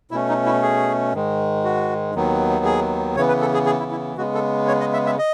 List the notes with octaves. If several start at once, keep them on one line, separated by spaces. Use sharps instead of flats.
B2 A3 C#4 E4
D#4
E4
G#4
G#2 D#3 G#3
F#4
D#2 D#3 F#3 B3
G#4
C#3 E3 B3 C#5
B4
A4
G#4
G#4
E4
E4
C#3 G#3 B3 F#4
A4
C#5
D#5
E5
E5
D#5